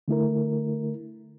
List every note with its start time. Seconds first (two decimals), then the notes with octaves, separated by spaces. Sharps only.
0.08 D3 A3 E4 A#4